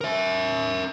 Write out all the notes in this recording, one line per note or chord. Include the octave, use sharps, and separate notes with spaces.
A#4 E5